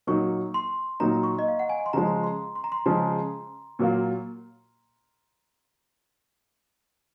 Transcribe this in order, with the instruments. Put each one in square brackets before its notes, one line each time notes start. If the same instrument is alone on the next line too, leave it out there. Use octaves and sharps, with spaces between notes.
[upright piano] A#2 F#3 A#3 D#4 [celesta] C#6
[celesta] C6
[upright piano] A#2 F#3 A#3 D#4 [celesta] A#5
[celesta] C#6
D#5
F5
F#5
G#5
C6
[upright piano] C#3 F3 G#3 [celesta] A#5
[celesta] C6
C6
A#5
C6
[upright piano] C#3 F3 G#3 [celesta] A#5
[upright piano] A#2 F#3 A#3 F4